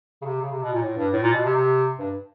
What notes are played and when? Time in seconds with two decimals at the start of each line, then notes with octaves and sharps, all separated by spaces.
0.21 C#3
0.25 C3
0.41 C#3
0.51 C3
0.62 B2
0.73 A#2
0.82 A2
0.97 G2
1.13 A2
1.23 A#2
1.33 B2
1.45 C3
1.55 C3
1.99 G2